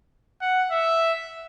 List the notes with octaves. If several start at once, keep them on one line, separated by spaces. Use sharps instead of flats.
F#5
E5